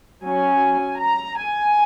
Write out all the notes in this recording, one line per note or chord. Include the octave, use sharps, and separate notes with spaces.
F#3 C#4 G#5
A#5
G#5